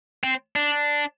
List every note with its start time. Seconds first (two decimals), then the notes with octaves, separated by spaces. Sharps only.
0.24 C4
0.56 D4